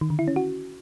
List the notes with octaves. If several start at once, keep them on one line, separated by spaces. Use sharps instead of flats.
D#3
D3
E4
C#4
F#4